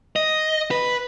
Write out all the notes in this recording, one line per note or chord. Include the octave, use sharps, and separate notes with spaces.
D#5
B4